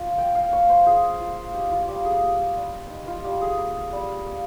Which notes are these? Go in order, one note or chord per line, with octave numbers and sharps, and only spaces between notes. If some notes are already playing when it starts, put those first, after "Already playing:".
Already playing: F4
A#3 G5
F5
A#3 C#5
C5
F4 G#4
F4
D#4 G4
F4
G3 G4
G#4
A#3 G4
G3
D#4
F4
G3 G4
G#4
A#3
G3
A#3